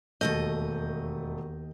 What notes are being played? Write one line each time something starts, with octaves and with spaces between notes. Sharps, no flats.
E1 D#2 A#2 A3 D#5 G6